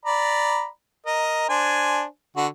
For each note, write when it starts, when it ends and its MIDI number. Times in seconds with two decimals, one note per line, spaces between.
0.05 0.67 74
0.05 0.67 82
0.05 0.67 83
1.06 1.46 70
1.06 1.46 75
1.49 2.03 62
1.49 2.03 72
1.49 2.03 80
2.36 2.47 50
2.36 2.47 66